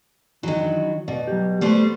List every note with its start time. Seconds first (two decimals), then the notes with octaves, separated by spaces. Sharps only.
0.43 D#3 E3 F#3 D4
1.08 B2 D5
1.28 F#3 G4
1.61 G3 A3 B3 C5